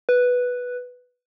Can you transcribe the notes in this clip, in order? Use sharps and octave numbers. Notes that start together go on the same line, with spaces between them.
B4